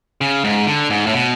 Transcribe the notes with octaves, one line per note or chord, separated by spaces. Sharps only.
C#3
G#2
D3
G#2
A2
B2